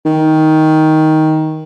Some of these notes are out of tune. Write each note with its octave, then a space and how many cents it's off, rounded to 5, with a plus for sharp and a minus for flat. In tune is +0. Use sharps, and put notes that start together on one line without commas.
D#3 +10